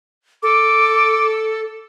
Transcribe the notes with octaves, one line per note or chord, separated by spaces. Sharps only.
A4 D6